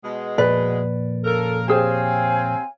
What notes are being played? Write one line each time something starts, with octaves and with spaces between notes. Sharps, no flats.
B2 G#3
F2 A#2 B4 D5
C#3 A4 A#4
C4 G4 G#4 C5 C#5 F5 G#5